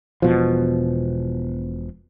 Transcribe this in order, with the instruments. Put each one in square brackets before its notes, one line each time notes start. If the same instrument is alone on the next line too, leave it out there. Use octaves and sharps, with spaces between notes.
[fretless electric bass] E1 B2 F3